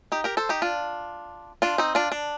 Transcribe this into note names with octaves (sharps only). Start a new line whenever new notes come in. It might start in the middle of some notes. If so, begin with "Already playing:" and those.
D#4 G4
G4 A#4
A4 C5
D#4 G4
D4 F4
D4 F4
C4 D#4
D4 F4
D4